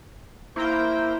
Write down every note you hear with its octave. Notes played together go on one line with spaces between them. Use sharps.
A#3 E4 A#4 C5 G5